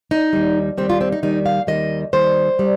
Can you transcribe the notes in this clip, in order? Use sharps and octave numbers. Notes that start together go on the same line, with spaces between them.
D#4
D#2 D#3 G3
D#2 D#3 G3 C4
F4
C4
D#4
D#2 D#3 G3 D#4
F5
D#2 D#3 G3 D#5
D#2 D#3 G3 C5
G3